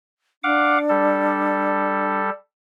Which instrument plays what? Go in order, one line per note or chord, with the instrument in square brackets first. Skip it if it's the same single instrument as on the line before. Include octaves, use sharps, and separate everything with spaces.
[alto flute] D4 [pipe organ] F5 F#5 D6
[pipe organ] G3 A4